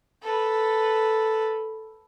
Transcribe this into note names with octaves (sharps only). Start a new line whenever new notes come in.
A4 B4